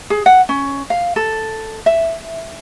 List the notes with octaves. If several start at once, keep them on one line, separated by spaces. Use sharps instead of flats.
G#4
F#5
C#4
F5
A4
E5